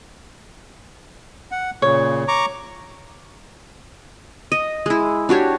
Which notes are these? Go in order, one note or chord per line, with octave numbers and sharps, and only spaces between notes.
F#5
A#2 C#3 C#5
A#5 C#6 D6
D#5
G#3 E4
D4 F#4 G4 C#5